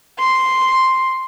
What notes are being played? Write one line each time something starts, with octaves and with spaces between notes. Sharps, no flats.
C6